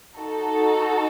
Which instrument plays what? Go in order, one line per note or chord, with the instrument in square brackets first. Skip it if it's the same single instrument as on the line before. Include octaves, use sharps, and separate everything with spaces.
[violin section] D#4 F#4 A4